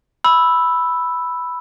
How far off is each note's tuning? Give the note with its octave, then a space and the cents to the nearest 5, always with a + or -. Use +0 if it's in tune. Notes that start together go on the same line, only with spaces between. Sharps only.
B5 +0 E6 +0